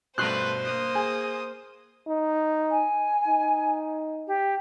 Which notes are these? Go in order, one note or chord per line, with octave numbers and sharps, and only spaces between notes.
G2 B2 A3 B4 C5 C6 F#6
A#3 D#6
G#4
D#4
G#5
D#4
G4